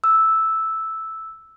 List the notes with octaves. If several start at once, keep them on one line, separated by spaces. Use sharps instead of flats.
E6